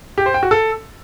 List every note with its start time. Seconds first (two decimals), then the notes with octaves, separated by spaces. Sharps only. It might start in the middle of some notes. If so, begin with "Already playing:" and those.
0.18 G4
0.26 C5
0.34 G5
0.43 F#4
0.51 A4